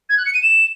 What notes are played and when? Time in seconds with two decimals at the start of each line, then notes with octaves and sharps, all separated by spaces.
0.09 G#6
0.18 F#6
0.26 C#7
0.34 D#7
0.42 E7